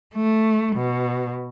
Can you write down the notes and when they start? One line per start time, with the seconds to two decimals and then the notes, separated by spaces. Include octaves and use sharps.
0.15 A3
0.76 B2